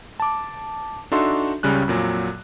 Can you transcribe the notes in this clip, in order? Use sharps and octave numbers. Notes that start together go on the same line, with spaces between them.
A5 D6
D4 D#4 F#4 A4 E5 C6
C#2 C#3 G3 C#4 F#6
F2 A#2 F#3